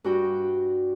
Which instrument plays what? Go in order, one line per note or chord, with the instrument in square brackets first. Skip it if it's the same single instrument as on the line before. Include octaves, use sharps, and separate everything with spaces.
[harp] G2 F#4 G5